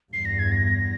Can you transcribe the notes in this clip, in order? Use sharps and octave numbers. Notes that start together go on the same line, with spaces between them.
E2 G2 C7
A#6
G#6
A#6